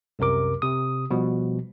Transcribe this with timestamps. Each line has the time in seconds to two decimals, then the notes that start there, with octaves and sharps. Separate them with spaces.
0.19 C2 F#2 C3 A#4 D6
0.62 C3 D#6
1.11 B2 F3 G3